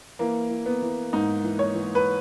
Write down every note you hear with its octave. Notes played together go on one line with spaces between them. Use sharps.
E3 A#3
E3
B3
E3
G#2 D#4
E3
C#5
E3
B4